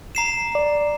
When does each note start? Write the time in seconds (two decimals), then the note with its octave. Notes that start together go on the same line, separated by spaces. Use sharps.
0.15 A#5 C7 E7
0.55 D5